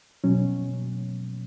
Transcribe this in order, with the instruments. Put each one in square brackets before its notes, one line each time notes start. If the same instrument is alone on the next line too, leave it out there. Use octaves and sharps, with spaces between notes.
[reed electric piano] B2 F#3 C#4